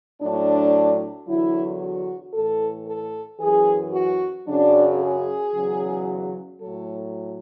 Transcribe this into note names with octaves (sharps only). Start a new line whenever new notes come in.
A2 F#3 D4
E2 D3 F#3 E4
F#4
A2 E3 A4
A4
F#2 E3 G#4
F#4
F#2 C#3 F#3 D4
G#4
E2 C#3 F#3
A2 F#3 A4